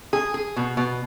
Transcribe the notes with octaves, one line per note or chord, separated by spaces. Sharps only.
G#4
G#4
B2
B2